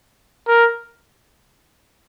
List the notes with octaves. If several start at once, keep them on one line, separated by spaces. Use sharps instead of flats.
A#4